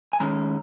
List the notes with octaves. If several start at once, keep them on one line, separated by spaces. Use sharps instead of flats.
G#5
D#3 G#3 C#4 A#5